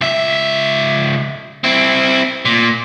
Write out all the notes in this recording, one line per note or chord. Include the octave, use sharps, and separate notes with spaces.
C#2 E5
C4 E4
A#2